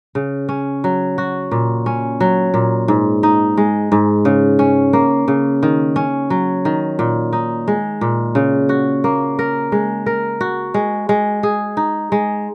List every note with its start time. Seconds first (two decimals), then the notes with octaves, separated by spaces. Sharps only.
0.15 C#3
0.49 C#4
0.84 F#3
1.18 F#4
1.51 A#2
1.86 C#4
2.20 F#3
2.54 A#2
2.88 G#2
3.23 D#4
3.57 G#3
3.92 G#2
4.25 C#3
4.59 C#4
4.93 A#3
5.28 C#3
5.63 D#3
5.96 C#4
6.30 F#3
6.65 D#3
6.99 A#2
7.33 D#4
7.68 G#3
8.01 A#2
8.35 C#3
8.69 F#4
9.04 A#3
9.39 A#4
9.72 G#3
10.06 A#4
10.41 F#4
10.74 G#3
11.09 G#3
11.43 G#4
11.77 D#4
12.12 G#3